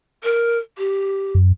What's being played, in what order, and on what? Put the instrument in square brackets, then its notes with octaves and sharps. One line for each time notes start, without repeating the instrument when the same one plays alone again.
[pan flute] A#4
G4
[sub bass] F#2